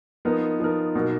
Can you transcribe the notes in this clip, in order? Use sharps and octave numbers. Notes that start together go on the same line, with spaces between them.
F3 B3 D#4 A#4
F3 B3 D#4 A#4
B2 F#3 A#3 D#4